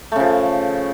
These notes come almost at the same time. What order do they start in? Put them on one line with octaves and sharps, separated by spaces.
A3 C#3 F3